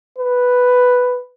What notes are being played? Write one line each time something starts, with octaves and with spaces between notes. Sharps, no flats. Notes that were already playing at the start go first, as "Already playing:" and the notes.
B4